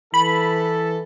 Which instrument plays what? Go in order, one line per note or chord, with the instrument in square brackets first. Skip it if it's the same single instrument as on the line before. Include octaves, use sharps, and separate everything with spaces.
[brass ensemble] E3 A4 [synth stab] B5